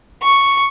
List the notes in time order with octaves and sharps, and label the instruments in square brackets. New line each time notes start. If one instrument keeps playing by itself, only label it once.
[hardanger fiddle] C#6